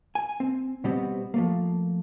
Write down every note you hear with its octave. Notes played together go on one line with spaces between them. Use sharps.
G#5
C4
B2 G3 B3 C4 F#4 G4
F3 A3 A#3